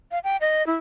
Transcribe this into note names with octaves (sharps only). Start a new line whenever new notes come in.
F5
G5
D#5
E4